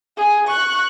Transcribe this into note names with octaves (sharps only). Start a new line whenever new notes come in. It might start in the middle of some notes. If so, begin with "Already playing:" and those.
G#4
C#6 F#6